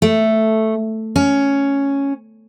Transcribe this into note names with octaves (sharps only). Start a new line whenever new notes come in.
A3
C#4